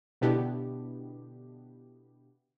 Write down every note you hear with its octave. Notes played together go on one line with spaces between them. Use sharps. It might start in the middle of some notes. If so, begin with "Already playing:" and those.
B2 D3 B3 D4 E4 G4